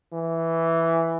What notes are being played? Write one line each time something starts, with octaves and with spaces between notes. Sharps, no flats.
E3